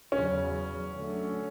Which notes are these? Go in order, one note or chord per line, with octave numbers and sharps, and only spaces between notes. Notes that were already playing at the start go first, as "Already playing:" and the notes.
E2 C#3 F#3 C#4
D3 F#3 A3 C#4